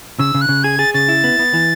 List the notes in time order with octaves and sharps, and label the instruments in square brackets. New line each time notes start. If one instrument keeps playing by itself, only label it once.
[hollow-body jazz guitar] C#3 [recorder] E6
[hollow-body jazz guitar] C#3
[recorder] F#6
[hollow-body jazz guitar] C#3
[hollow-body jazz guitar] G#4 [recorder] G#6
[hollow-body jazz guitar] G#4 [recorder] A6
[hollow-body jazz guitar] C#3 [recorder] A6
[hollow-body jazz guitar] E4
B3
B3
E3